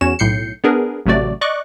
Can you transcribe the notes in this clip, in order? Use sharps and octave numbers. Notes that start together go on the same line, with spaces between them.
E2 C#4 F#4 C#5 E7
B1 A2 G6 C7 C#7
B3 D4 G#4 A#4 B4
A1 C3 F#3 A3 F#4 D5
D5 D#5 C#6 D6 F#6